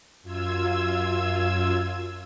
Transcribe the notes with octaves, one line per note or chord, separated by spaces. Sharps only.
F#2 F4 E6 G#6